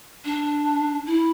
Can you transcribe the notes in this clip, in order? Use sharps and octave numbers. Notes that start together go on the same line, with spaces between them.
D4
E4